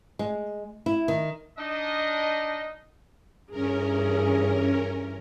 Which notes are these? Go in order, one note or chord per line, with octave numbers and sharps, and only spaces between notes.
G#3
E4
D#3
D4 D#4 D#5
G2 E3 C#4 G#4 A#4